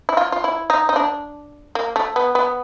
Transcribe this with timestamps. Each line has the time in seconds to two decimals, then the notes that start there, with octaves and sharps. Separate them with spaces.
0.09 E4
0.17 F4
0.32 F4
0.44 E4
0.70 D#4
0.89 D#4
0.96 D4
1.75 A#3
1.96 A3
2.16 B3
2.35 B3